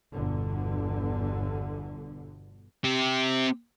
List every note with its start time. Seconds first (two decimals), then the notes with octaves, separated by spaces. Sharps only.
0.13 G1 E2 B2 D3
2.84 C4 G4